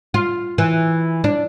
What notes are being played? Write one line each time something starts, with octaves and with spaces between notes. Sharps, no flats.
F4
E3
D4